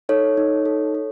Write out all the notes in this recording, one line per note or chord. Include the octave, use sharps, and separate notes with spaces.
D#4 A4 C#5
D#4
A4
A4